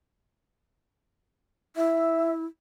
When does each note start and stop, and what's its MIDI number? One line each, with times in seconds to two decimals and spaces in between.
1.76 2.45 64
1.76 2.32 76